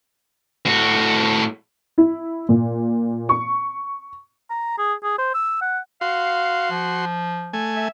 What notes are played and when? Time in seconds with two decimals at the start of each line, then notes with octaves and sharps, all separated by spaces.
0.66 A2 F#4
1.98 E4
2.49 A#2
3.29 C#6
4.50 A#5
4.78 G#4
5.04 G#4
5.18 C5
5.34 E6
5.62 F#5
6.01 F#4 F5 C6
6.71 F3
7.53 A3 G#5
7.76 E5